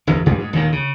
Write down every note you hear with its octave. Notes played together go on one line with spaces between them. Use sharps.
G1 E2 G2
A#1 G2 G3 G#3
G#2
D#2 A#2 D#3
C#3